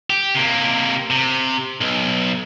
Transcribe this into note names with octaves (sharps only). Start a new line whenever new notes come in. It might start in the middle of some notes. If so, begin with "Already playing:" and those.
G4
C3 A#3
C3
B1